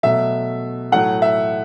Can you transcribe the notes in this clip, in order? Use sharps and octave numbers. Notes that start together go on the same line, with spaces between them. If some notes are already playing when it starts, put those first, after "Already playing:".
B2 F#3 A3 E5
A2 F#3 A3 F#5
E5